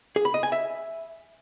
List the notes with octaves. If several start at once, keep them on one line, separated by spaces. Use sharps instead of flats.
G#4
B5
D#5
G#5
E5